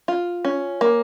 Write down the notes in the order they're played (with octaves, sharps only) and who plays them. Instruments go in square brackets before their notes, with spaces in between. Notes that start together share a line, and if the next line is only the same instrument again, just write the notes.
[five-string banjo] F4
C#4
A#3